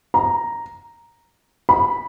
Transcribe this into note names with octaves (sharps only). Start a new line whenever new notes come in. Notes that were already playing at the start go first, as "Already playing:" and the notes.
A#5
B5